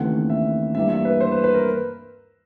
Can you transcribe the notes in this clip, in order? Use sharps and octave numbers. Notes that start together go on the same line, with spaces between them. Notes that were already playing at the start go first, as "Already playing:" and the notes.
Already playing: D#2 C#3 E3 A3 C4 F#5
E5
G2 E3 G3 A#3 E5
E5
B4
C5
B4
B4
A#4